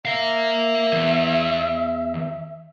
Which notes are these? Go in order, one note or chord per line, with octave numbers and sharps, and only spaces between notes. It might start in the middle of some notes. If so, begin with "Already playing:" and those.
A#4 E5 F5
E2